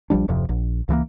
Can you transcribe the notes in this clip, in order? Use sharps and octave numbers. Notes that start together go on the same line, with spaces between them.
A#1 F3 G3 D4
D1 F2 C3 F3
A#1
C#2 E3 G#3 A#3